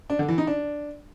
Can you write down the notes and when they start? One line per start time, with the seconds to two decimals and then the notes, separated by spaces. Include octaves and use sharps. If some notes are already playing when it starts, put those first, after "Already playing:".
0.10 D4
0.19 D3
0.28 E3
0.38 D#4
0.47 D4